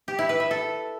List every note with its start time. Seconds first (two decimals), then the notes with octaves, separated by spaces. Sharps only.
0.08 G4
0.19 E4
0.29 B4
0.40 E5
0.51 A4